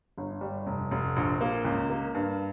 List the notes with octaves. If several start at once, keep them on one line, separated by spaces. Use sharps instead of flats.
G1
G3
F1
F1
A#1
A#3
C#2
A#3
G2